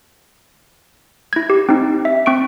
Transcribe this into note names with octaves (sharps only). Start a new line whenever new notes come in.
E4 G#6
G4
C4 D#4
E5
C4 C#6 D7